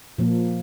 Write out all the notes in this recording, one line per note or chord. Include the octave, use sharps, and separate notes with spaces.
A#2 F3 A#3